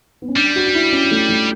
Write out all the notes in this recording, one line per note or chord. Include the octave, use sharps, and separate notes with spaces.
B3
C#4
G3 D4
F#4
F#4
E4
C#4
A3
A3